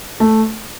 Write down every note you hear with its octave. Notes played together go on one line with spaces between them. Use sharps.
A3